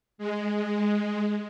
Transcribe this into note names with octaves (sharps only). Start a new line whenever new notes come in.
G#3